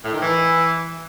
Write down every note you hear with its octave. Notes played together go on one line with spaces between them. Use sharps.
A2
D#3
E3